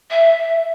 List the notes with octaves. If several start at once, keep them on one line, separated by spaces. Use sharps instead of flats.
E5